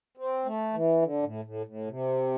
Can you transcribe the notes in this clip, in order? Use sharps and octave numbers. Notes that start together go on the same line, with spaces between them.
C4
A3
E3
D3
A2
A2
A2
C3